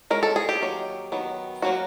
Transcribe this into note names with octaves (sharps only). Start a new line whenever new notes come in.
G#3 C#4 A#4
A4
G#4
G4
D#3 F#3 A#3
D#3 F#3 B3
F#3 A#3 C#4 F#4